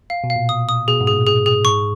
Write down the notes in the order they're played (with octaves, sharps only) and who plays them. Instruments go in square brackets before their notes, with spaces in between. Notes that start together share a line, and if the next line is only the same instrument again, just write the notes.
[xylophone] F5
[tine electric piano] B2
[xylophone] F5
[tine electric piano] A#2
[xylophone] D#6
D#6
[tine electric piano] B2 [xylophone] G#4
[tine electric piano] G#2
[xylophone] G#4
[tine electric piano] A#2
[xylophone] G#4
G#4
[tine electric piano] G#2 [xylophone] C#6